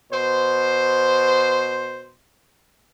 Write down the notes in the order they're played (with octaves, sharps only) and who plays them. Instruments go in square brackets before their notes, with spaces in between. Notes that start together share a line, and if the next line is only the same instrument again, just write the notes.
[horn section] B2 C5